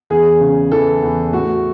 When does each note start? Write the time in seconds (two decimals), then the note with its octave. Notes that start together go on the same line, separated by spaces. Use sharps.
0.10 E2 G#4
0.41 C#3
0.72 E3 A4
1.03 E2
1.33 A2 F#4